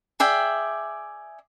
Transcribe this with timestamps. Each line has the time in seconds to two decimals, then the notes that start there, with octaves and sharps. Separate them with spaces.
0.20 G#4 D5 E5 G5